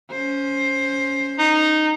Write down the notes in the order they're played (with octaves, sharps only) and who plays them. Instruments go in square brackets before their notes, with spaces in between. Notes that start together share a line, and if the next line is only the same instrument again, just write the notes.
[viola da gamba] C#4 C5
[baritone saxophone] D#4